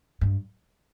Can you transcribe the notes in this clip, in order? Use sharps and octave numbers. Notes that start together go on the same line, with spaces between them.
G2